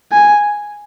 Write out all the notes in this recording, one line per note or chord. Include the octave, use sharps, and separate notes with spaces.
G#5